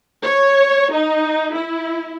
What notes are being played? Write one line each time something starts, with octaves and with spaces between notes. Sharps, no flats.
C#5
D#4
E4